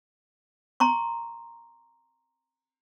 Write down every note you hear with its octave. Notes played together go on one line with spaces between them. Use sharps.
A#5 C6 C#6